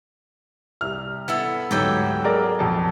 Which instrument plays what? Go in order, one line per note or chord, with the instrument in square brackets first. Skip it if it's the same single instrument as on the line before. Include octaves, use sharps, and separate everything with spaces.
[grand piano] C2 F6
[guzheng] B3 E4 A4
[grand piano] D2 G#2 [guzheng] F#3 G4 A4
[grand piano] G#4 A#4 D5
A#1 F2 A5